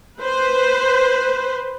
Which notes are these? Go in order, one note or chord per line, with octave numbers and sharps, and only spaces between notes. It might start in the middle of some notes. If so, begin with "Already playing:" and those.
B4 C5